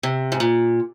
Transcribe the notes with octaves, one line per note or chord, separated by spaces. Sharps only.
C3
G#2
A#2